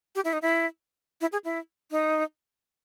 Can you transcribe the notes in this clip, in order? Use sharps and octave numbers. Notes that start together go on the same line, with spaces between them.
G4
E4
D#4
E4
E4
G#4
E4
D#4